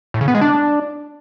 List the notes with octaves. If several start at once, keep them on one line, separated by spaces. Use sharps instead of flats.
A2
C#3
B3
G#3
D4